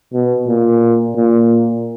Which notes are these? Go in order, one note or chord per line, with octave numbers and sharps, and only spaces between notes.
B2
A#2
A#2